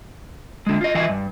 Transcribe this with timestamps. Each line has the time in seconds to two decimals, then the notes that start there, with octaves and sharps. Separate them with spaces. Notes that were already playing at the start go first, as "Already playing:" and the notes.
0.66 D3 G#3
0.81 F4 D#5
0.95 E3 F4 D#5 E5 G#5
1.09 G2